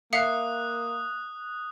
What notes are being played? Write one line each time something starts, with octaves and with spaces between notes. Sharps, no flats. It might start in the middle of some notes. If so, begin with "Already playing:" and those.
A#3 E5 F5 D#6 F#6 C#7